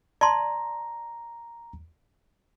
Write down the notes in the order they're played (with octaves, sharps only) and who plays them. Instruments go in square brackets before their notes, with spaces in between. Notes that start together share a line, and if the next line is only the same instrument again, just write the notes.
[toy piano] D5 A5 C6 [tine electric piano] A#5